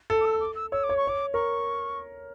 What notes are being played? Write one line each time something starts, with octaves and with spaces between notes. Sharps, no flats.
A4
D6
E6
D6
E6
C#5 E6
D6
C#5
C#6
C#5 D6
A#4 C#6